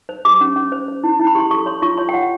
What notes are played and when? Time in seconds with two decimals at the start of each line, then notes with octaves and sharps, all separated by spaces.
0.09 C5
0.25 G4 D6
0.41 C#4
0.56 C#4
0.72 C5
0.88 C5
1.04 E4
1.19 E4
1.27 B5
1.35 G4 C6
1.51 A4 C#6
1.66 C#5 C6
1.82 F4 C#6
1.98 C#5 C6
2.09 G5
2.14 F4 F#5